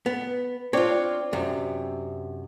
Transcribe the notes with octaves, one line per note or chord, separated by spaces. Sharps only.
B3
C4 D4 F4 C#5
F#2 C3